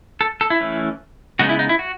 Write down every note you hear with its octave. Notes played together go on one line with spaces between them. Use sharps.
A4
A4
E4
E3 A3 C#4
C#3 G#3 B3 D#4 F#4
E4
D#4
E4
F#4